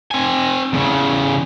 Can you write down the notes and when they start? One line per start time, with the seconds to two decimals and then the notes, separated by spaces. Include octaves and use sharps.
0.11 C4 G#5
0.73 E2 C#3